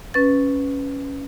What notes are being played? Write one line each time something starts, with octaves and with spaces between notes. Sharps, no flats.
C#4 B4 A6